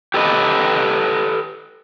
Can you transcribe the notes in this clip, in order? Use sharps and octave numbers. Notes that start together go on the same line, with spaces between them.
G4 A4 B4 D#5